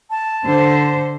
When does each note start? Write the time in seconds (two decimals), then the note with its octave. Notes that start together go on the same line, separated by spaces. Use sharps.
0.10 A5
0.43 D3 C5